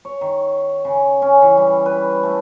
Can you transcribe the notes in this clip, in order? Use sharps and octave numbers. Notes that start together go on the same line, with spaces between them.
C#5
D#3
C#3
C#4
E3
G3
B4
A3